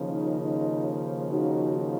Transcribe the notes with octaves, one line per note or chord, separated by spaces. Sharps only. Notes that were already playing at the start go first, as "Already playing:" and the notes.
Already playing: D#2 C#3 F3
D#4
D#4
D#4 F#4